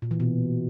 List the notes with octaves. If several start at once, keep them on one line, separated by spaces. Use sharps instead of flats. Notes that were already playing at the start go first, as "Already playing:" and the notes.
A#2
E3
B2